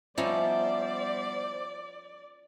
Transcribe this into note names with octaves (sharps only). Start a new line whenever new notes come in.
F3 G3 B3 C#4 D#4 E4 C5 D5